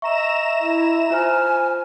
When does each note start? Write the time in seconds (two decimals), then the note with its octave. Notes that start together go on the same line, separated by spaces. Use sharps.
0.02 D#5 E5 A#5 C#6 E7
0.61 E4
1.10 F4 C5 G#5 F6